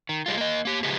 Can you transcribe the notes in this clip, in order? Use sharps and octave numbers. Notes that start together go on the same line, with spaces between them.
D#3
G3 G#3 F4
A#3 D#5
A#3 G4
C#3 E3 F3 G#3 B3 G4